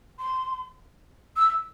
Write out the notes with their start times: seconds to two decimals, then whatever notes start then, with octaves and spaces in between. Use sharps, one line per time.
0.19 C6
1.36 E6